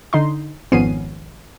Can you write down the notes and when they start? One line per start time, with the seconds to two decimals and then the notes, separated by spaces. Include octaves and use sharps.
0.13 D3 D#4 C6
0.72 G#1 F2 B3 C#4 C7 D#7